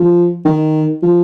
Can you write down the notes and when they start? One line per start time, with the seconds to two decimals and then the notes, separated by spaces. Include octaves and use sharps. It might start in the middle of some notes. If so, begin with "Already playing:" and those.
Already playing: F3
0.45 D#3
1.02 F3